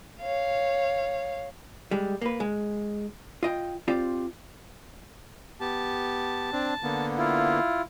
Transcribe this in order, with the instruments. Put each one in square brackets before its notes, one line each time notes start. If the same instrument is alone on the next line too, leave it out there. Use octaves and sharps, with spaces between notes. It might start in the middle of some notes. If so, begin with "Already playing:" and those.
[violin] C#5 F5
[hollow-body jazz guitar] G3 G#3
A#3 B4
G#3
F4 D#5 G5
C4 F4 G4 D5
[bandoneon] B3 G4 [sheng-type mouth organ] A5
[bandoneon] C4 D4
D3 A#3 B3
[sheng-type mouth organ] E4 F4